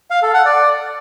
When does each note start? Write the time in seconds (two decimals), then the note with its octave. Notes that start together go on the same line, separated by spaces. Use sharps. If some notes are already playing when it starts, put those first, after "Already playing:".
0.11 F5
0.22 A4
0.34 F#5
0.45 D5